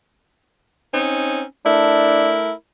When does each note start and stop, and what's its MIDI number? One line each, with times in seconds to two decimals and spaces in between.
0.94 1.43 60
0.94 1.43 61
0.94 1.43 63
1.65 2.52 57
1.65 2.36 62
1.65 2.52 64
1.65 2.52 70